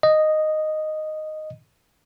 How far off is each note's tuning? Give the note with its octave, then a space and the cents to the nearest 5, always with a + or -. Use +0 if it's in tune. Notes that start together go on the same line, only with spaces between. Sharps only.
D#5 -5